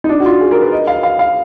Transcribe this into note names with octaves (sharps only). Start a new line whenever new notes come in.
D#4
D4
F#4
F4
G#4
A#4
B4
D#5
F5
F5
F5